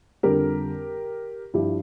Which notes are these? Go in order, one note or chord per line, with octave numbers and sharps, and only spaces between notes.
F2 D3 G3 G4 A#4
G2 F3 E4 G4